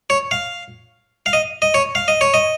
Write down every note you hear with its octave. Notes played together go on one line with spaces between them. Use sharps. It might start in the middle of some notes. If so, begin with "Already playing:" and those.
C#5
F5
F5
D#5
D#5
C#5
F5
D#5
C#5
D#5